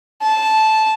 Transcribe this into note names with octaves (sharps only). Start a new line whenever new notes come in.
A5